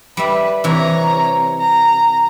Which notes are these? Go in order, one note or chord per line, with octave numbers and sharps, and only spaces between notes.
G3 B4 E5
C3 E3 C#5 A#5
A#5